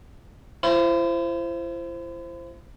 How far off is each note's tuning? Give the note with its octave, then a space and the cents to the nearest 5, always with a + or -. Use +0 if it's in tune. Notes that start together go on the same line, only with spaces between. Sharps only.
E4 +45 C5 +0